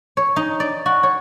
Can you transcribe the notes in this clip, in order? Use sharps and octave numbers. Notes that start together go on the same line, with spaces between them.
C#5
D#4
D5
F#4
C#5